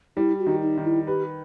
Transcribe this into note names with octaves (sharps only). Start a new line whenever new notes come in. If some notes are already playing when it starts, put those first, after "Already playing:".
G3 E4
F#4
D#3
D#4
D#3
E4
G4 B4